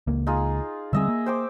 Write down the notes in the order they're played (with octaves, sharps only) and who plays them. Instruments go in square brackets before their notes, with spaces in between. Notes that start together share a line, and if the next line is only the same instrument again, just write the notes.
[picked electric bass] C#2 A#3
[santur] D#4 F4 G#4
[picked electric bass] D3 G3 C4 [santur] G#4 D#5 E5
[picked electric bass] A#3
[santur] C5 G5 D6